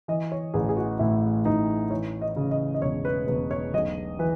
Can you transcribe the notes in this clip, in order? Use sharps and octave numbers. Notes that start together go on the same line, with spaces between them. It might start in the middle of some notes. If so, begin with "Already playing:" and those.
E3 D#5
C#5
A1 G#4
G#4
F#4
A2 E4
A1 D#4
E3 C#5
D#5
C#3
D#5
D#5
E1 C#5
B4
E1 B4
C#5
B1 D#5
E3 B4